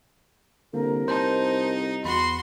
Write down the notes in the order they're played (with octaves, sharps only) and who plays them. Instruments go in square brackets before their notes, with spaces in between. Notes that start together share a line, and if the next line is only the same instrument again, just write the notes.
[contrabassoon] C2 [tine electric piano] D3 A#3 [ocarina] A#4
[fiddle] D#4 [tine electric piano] C5 A5
[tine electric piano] E2 B5 [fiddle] F#4 C6